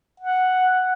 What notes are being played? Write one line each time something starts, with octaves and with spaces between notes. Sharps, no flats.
F#5